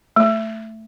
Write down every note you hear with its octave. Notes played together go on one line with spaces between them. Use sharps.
A3